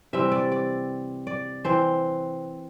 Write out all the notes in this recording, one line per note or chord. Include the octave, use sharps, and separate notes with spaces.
C3 E3 G3 C4 E5
D5
D5
D5
E3 C4 C5